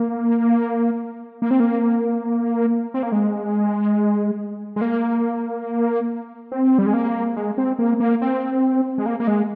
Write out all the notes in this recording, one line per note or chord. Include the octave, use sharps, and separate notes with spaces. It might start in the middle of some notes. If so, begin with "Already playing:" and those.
Already playing: A#3
A#3
C4
A#3
C4
A#3
G#3
G#3
A#3
C4
G3
G#3
A#3
G#3
C4
A#3
A#3
C4
G#3
A#3
A#3
G#3